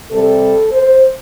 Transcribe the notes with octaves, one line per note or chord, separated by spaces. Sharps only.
C3 G3 A4
C5